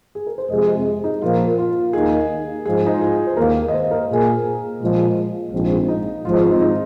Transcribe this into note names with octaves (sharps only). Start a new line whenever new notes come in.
G#4
A#4
C5
F2 C3 G#3 D#5
D#4
A#2 F3 A#3 F4
F4
D#2 D#3 A#3 D#4 G#4
G#2 F3 G#3 G#4
D#4
F4
G#4
C5
D#2 D#3 A#3 A#4
D#5
C5
A#4
A#2 A#3 G#4
A#2 F3 G#3 F4
A#1 G#2 F3 G#3 C4
D#4
G#1 G#2 F3 G#3 F4
D#4
C4
D#4
D#4